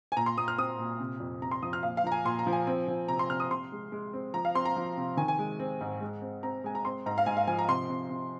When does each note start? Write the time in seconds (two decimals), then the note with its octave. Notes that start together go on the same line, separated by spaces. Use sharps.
0.12 G#5
0.17 A#2 A#5
0.26 C6
0.37 A#2 D#6
0.48 F6
0.58 C4 D#6
0.79 A#2
1.00 C3
1.20 F2
1.42 C3 A#5
1.52 C6
1.63 F3 D#6
1.73 F6
1.83 A#2 F5
1.97 F5
2.04 F3 A#5
2.12 G#5
2.25 A#2 C6
2.39 A#5
2.47 F3
2.53 G#5
2.67 C4
2.88 F3
3.08 C3 A#5
3.19 C6
3.30 C3 F6
3.40 D#6
3.50 C3 C6
3.72 G#3
3.92 G#3
4.13 C4
4.34 F3 A#5
4.45 F5
4.55 C4 C6
4.65 A#5
4.76 F3
4.97 C3
5.17 D#3 G#5
5.28 G#5
5.39 G#3
5.59 C4
5.81 G#2
6.01 G#3
6.22 C4
6.43 C4 A#5
6.64 G#3 G#5
6.75 A#5
6.85 C4 C6
7.06 G#2 A#5
7.18 F5
7.26 G#2 G#5
7.37 F5
7.47 F3 G#5
7.59 A#5
7.68 C3 C6
7.89 C3
8.10 C3